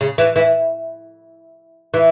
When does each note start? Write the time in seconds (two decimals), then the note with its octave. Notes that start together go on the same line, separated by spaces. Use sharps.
0.01 C#3
0.18 E3
0.36 E3
1.94 E3